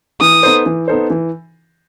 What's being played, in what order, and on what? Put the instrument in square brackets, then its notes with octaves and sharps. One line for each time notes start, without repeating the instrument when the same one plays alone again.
[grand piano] E3 [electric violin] D#6
[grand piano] B3 D#4 A4 C5
E3
B3 D#4 A4 C5
E3